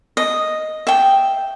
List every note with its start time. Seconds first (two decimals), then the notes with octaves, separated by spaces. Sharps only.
0.17 D#5
0.87 E5 G5